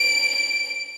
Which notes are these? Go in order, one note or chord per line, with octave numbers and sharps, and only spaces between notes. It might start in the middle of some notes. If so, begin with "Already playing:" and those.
Already playing: D7
D7